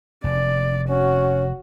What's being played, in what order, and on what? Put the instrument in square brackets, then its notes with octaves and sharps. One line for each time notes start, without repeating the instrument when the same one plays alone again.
[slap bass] F1 [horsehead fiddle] D5
[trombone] C#4 [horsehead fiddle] F#4